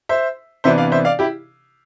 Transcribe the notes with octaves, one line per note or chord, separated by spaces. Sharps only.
C5 E5
C3 E3 B3 D4 C5 E5
D5 F5
C5 E5
D5 F5
E4 G4